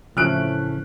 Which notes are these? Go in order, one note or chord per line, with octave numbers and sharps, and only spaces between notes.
A2 C#3 E3 F3 A3 F6 F#6 D7